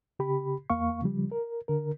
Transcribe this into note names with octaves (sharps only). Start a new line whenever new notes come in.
C#3 G4 B5
E2 A#3 F5 C#6
C#3 F3 G3
A#4
D3 A#4